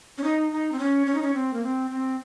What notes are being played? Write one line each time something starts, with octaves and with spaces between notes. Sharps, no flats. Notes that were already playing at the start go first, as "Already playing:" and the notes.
C#4
D#4
D#4
C4
C#4
C#4
D#4
C#4
C4
A#3
C4
C4